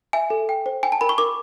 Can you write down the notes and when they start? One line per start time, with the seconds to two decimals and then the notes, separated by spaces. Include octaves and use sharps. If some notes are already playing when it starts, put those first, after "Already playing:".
0.13 E5 G#5
0.30 A4
0.49 G5
0.66 C5
0.83 G5 G#5
0.92 A5
1.01 A#4 B5
1.09 C#6
1.18 A#4 D6